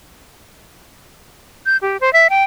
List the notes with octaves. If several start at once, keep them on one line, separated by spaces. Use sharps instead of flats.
G6
G4
C5
E5
G5